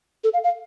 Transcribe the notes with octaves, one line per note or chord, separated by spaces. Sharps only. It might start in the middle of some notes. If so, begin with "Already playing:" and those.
A4
F5
F5